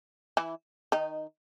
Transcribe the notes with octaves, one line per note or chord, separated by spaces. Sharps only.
E3 E4
D#3 D#4